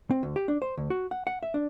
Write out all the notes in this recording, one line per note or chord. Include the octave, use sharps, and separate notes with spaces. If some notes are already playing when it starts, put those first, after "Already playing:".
C4
D2
G4
D4
C5
D2
F#4
F#5
F#5
E5
D4